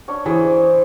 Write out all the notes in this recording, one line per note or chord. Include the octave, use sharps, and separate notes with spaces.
C#4 D4 C#5
E3 G#4 C5